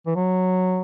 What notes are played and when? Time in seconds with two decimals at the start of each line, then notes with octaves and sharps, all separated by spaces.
0.06 E3
0.15 F#3